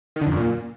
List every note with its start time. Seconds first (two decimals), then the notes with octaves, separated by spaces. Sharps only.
0.16 D#3
0.21 D3
0.26 F2
0.32 F#2
0.37 A#2